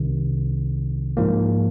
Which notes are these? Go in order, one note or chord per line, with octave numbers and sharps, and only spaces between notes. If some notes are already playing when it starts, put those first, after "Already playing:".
Already playing: C2 C3 D#3
G#2 F3 A#3